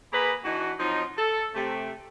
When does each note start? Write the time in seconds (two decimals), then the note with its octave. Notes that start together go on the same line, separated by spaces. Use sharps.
0.12 A#3 G#4 B4 A#5 B5
0.44 E3 D4 D#4 F#4
0.79 F3 F#3 C4 D#4
1.17 A4
1.55 C3 A3